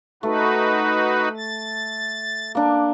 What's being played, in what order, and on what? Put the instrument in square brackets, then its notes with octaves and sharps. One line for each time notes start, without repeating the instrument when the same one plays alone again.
[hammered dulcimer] A3 [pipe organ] D#4 F#4 B4
[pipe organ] A6
[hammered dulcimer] A#3 D4